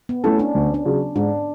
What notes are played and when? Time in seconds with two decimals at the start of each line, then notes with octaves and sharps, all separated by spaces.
0.09 B3
0.24 A3 C#4 E4 A4
0.39 D4
0.55 D2
0.74 D4
0.85 C#3 F#3
1.15 G#2 D4